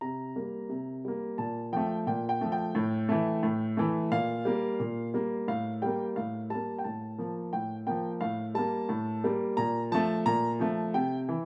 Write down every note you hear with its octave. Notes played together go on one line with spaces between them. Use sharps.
C3 A#5
G3 A#3
C3
G3 A#3
A#2 A5
F3 A3 G5
A#2 G5
G5
F3 A3
G5
A2
E3 A3
A2
E3 A3
A#2 F5
G3 A#3
A#2
G3 A#3
A2 F5
G3 A#3 G5
A2 F5
G3 A#3 A5
G5
A2 A5
F3 A#3
A2 G5
F3 A#3 G5
A2 F5
G3 A#3 A5
A2
G3 A#3
A#2 A#5
F3 A3 A5
A#2 A#5
F3 A3
C3 G5
E3